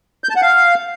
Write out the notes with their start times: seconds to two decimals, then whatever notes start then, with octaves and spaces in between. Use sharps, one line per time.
0.24 G6
0.30 A5
0.36 F#5
0.42 F5